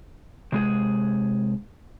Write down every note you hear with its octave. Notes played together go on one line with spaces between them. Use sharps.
C3 G#3 G#4